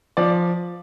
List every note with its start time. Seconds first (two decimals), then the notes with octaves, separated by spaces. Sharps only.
0.17 F3 D5